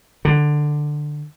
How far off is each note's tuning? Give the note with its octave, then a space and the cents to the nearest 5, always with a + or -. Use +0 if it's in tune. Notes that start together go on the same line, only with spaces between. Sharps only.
D3 +15